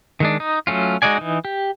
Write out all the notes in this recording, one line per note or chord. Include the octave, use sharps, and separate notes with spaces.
D#3 G#3 D4
D#4
F#3 A3 C#4 F4
G#3 D#4 F#4 D5 G#5
E3 D#4
G4